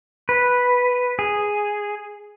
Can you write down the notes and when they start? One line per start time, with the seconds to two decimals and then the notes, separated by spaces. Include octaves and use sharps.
0.29 B4
1.19 G#4